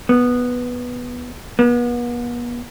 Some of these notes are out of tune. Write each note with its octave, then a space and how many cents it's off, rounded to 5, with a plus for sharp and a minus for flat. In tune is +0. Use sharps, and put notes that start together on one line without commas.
B3 -5
B3 -40